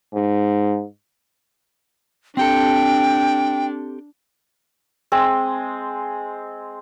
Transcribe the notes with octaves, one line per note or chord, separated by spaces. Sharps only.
G#2
C4 D4 G4 A4 G5
G#3 C4